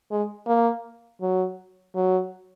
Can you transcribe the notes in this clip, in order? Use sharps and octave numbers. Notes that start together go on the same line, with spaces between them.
G#3
A#3
F#3
F#3